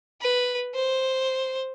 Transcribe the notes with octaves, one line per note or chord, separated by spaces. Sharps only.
B4
C5